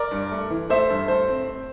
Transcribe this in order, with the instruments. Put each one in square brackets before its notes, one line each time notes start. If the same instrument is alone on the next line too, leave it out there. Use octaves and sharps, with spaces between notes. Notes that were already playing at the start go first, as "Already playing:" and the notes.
Already playing: [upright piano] A#4 D5
G2
A3
E3
A3 C5 E5
G2
A3 C5
C4
C4